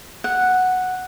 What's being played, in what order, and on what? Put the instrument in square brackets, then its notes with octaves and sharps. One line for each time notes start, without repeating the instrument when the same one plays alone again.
[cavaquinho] F#5